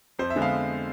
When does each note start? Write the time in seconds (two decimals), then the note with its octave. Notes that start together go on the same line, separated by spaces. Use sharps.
0.19 F2 C5
0.30 E5
0.36 D3 G#3 B3
0.42 F5